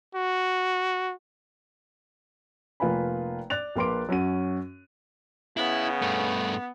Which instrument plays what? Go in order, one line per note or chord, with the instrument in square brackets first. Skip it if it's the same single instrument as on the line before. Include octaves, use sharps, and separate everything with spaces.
[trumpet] F#4
[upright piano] F1 A#3 F4 B4 G#5 B5
D5 F#6 A6 F7
A#1 A#3 B4 C6 D6 D7
F#2 C#4 F#4 D#7
[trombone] C#3 [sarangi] B3 [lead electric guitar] E4
[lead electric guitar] G2 A3